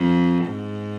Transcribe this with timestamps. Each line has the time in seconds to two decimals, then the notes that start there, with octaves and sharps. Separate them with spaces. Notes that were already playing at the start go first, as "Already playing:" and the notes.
Already playing: F2
0.46 G#2